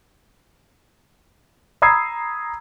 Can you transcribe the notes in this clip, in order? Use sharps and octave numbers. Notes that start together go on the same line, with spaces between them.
A#5 B5 D#6 E6 G#6 C7